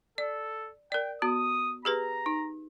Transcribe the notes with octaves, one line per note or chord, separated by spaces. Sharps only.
A4 D5
A#4 D5 G5
B3 F#4 D#6
G4 G#4 B4 A#5
D#4